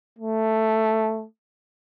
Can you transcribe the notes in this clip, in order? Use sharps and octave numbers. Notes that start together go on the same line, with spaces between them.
A3